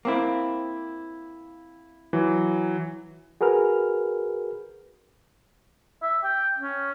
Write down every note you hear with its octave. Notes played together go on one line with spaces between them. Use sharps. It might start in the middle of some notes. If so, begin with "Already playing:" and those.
A#3 C4 E4
E3 F#3
F#4 G#4 A#4 B4 F6
E5
G5
C#4